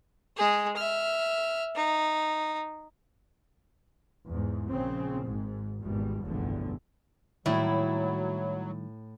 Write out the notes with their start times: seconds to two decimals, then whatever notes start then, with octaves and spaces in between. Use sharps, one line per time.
0.37 G#3 G#4
0.77 E5 F6
1.75 D#4
4.27 E2 G#2
4.69 A#1 C#3 C4
5.25 G#1 G#2
5.81 G#1 E2 B2 G3
6.24 F1 B1 E2 G2 D3
7.46 A2 D#3 F#3 G3 A#3 E4